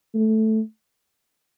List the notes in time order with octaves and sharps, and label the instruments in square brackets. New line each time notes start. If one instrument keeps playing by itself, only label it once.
[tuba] A3